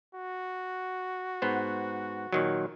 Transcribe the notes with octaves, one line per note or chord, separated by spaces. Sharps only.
F#4
G#2 B3 C5
A#2 D#3 F#3